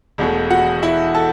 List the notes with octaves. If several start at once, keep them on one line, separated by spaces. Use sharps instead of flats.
E1 E2 B2 A3
F#4 F#5
E4 E5
A4 A5